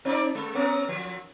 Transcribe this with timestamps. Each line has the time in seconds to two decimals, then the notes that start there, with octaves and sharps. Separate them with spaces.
0.05 C4 D#4 D5
0.35 G#3
0.55 B3 C#4 A#4
0.88 F3